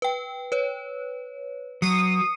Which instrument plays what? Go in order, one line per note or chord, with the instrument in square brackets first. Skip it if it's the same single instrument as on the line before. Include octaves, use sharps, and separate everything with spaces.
[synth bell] B4 G5
B4 C#5
[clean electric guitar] F#3 [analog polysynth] D#6 [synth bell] C7 C#7